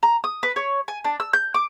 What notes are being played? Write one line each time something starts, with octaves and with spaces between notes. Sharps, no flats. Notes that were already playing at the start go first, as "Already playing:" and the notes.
A#5
D#6
B4
C#5
G#5
D4
E6
G6
D6